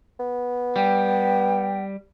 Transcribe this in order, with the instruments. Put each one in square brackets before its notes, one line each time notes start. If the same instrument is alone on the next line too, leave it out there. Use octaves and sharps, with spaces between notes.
[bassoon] B3
[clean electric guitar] G3 [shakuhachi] G5